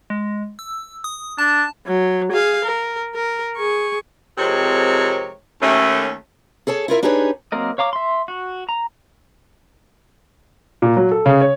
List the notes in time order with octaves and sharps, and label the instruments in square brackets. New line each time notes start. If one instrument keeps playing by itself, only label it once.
[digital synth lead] G#3
E6
D#6
[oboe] D4 [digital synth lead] A5
[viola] F#3
G#4 F5
A#4
A#4
G#4 C#6
[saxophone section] F2 C3 G#3 C4 A#4 C#5
D#2 A3 C#4
[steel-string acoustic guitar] G#4 A4 C#5 A5
E4 F4 A#4 E5
D4 D#4 G4 G#4 B4 C#5
[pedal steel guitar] F#3 A#3 C4 A#4 D#5
C#5 F5 A#5 D6
E5 C6
F#4
A#5
[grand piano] A#2
F#3
A4
C#3
C#5